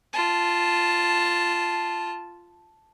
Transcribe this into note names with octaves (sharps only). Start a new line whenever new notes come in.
F4 A5